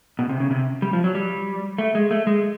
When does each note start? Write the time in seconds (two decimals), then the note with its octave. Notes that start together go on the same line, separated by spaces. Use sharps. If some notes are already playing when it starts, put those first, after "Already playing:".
0.19 B2
0.29 C3
0.40 C#3
0.51 C3
0.82 G3
0.93 F3
1.04 F#3
1.15 G3
1.78 A3
1.95 G#3
2.11 A3
2.27 G#3